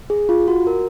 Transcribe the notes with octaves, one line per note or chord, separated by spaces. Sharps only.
G#4
F4
F#4
A#4